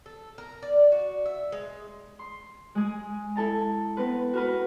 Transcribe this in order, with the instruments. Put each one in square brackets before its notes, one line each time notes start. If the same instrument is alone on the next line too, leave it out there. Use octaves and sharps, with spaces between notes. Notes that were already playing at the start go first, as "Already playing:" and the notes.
[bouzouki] A4
A#4
D5
F#4
E5
G#3
[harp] C6
G#3 G#4
E4 A4 A5 A#5
B3 C4 B4
F#4 A#4 B4